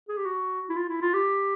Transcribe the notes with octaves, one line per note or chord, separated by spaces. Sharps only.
G#4
G4
F#4
E4
F4
E4
F4
G4